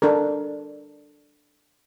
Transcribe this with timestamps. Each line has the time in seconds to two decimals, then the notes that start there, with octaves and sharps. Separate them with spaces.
0.02 D4 A4 A#4